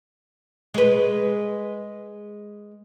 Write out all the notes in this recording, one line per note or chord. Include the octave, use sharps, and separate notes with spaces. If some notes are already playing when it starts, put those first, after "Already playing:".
G#3 B4